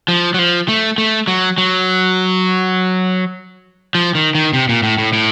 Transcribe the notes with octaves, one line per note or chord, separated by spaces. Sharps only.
F3
F#3
F3
A3
A3
F#3
F#3
F3
D#3
D#3
C3
A#2
A2
A2
A2